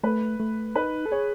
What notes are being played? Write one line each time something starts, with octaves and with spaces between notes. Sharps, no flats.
A3 B4
A3
D#4 B4
A4
G#4 C#5